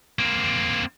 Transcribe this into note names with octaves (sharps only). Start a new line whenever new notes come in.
A#3 C4